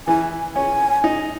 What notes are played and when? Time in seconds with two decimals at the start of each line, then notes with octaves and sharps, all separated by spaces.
0.07 E3 G#5
0.55 C#4 G#5
1.04 D#4